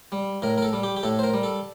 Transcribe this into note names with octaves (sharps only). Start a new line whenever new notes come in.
G3
A2 A#4
A#4
A4
G3
G4
G4
A2 A4
C5
A#4
G3
A4